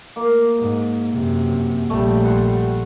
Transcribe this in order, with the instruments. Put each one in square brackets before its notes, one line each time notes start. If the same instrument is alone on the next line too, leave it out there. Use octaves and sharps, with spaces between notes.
[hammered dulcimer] A#3
[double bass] G#2
F#2 C3
[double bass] A#1 G3 [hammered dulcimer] A3
[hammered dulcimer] F#5 C6